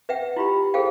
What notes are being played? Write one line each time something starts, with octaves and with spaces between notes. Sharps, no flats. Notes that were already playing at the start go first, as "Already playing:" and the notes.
B4 E5 F#5 G5
E4 F4 G4 B5
G#4 A4 C5 F5 G5